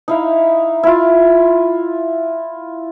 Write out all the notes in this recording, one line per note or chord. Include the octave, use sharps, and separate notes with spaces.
D#4 E4 F5
E4 F4